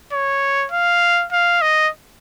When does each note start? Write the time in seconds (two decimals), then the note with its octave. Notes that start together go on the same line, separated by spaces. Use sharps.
0.12 C#5
0.72 F5
1.32 F5
1.62 D#5